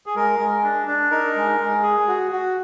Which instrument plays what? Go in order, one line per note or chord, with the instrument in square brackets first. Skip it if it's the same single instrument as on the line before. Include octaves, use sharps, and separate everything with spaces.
[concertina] G#4
G#3 A#4
G#3
D4
D4
D#4 A#4
G#3
G#3
G#4
F#4
F#4